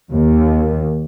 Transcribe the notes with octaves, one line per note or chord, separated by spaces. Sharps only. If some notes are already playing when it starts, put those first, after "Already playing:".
D#2